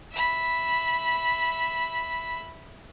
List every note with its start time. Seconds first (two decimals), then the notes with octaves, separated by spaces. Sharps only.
0.12 E5 B5